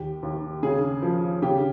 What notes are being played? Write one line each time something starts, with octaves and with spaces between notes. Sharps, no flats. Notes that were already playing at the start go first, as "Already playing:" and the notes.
Already playing: D#2 G4
D#2
C#3 G#4
F3
C#3 G4